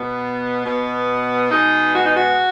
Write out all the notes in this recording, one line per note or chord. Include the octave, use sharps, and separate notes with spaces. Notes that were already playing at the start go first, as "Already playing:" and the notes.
Already playing: B2 B3
B2 B3
B2 G#3 B3 D#4
F#4
D#4
F#4